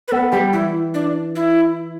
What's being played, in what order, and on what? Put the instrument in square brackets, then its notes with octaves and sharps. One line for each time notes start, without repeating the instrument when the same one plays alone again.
[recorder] B4
[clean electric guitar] B3 [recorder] A4
[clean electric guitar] G3 [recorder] G4
[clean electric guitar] E3 [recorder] E4
[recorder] D4
E4